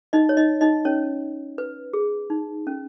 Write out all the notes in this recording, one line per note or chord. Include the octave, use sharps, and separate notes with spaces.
D#4 D#5
C#5
D#4 D#5
D#4 D#5
C#4 C#5
B4
G#4
D#4
C#4